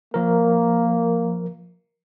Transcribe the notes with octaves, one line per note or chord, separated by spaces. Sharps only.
F3 A#3 A#4